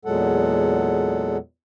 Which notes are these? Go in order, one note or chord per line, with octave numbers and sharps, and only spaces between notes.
E2 A#2 F#3 G#3 A4 F#5